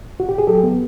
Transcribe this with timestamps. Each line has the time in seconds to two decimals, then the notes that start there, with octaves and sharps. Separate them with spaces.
0.20 F#4
0.29 G4
0.38 G#4
0.47 F#3 G4 A4
0.63 B3